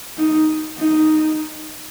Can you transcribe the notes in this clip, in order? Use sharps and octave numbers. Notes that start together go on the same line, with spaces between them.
D#4
D#4